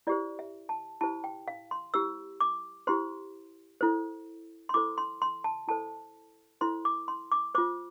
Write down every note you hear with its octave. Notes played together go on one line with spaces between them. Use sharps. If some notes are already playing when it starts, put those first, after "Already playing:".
E4 G4 C5 D5
E5
A5
E4 G4 C5 A5
G5
F5
C6
E4 G4 C5 E6
D6
E4 G4 C5 C6
E4 A4 C5
C6
E4 A4 C5 D6
C6
C6
A5
E4 A4 C5 A5
E4 A4 C5 C6
D6
C6
D6
F4 C5 D6